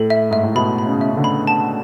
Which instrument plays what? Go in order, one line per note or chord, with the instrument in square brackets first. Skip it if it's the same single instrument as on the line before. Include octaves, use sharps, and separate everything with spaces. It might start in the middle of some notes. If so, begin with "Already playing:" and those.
Already playing: [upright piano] A2 [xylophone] A4
[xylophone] E5
[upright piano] G#2 [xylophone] E5
[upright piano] A2
[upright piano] B2 [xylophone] B5
[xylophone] B5
[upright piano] C#3
[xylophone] E5
[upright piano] C#3
D3
[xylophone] B5
A5